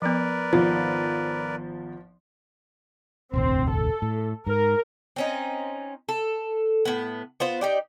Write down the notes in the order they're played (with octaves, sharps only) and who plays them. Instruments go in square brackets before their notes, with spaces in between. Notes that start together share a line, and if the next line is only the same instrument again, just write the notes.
[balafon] F3 B3 [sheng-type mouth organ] A#4 B4 D5
[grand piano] G#1 B3 [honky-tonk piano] F3 [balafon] F4 C5
[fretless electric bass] E1 A1 D2 [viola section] C4
[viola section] A4
[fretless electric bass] A2
[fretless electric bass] G#2 [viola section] A#4
[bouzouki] C4 C#4 D#4
A4
A2 B3
B3 F4 C5
D#4 G4 D5